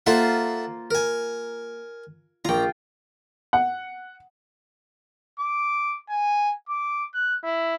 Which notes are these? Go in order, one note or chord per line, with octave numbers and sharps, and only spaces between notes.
A#3 F4 A4 C5 E5 F#5
A#4 G#5
A#1 F4 G5 A#5
F#5
D6
G#5
D6
F#6
E4